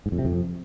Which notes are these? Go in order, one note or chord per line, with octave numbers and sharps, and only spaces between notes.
G#2
F2
C3
F2